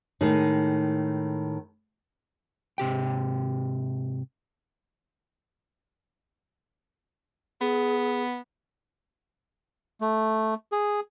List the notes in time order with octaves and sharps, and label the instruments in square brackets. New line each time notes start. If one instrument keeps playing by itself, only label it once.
[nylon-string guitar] A2 D#3 G#3 D#4
[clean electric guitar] G#2 C3 G4 G5
[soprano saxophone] B3 [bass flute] G#4
[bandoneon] A3
G#4